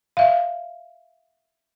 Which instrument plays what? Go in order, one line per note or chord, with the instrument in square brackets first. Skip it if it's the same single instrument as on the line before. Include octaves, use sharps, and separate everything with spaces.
[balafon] E5 F5